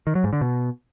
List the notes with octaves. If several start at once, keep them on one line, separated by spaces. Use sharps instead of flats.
D#3
F#3
G#2
D3
B2